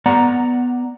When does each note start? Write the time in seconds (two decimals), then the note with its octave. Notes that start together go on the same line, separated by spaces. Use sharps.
0.06 B3 D5 F#5 A#5